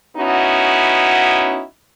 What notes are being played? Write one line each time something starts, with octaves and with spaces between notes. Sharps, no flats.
B3 C#4 D#4 E4 F#4